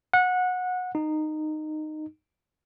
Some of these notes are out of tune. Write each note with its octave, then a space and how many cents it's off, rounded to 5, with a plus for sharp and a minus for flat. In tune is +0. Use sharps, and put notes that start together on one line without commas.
F#5 -20
D#4 -15